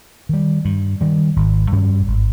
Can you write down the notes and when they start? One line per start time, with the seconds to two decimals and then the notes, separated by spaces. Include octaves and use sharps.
0.29 D#3 G3
0.65 G2
1.01 D#3 G3
1.36 G#1
1.72 G2 G3 C#4
2.07 G#1